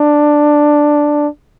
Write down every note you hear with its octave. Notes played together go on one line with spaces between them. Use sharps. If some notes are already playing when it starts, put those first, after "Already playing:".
Already playing: D4